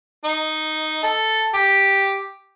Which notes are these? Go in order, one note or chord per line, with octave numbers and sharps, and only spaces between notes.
D#4
A4
G4